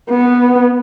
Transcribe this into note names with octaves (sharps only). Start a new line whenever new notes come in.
B3